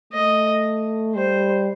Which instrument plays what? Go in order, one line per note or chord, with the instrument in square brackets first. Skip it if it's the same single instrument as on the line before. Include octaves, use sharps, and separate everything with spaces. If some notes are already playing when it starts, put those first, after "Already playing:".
[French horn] A3 [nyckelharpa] D#5
[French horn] G3 [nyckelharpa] C5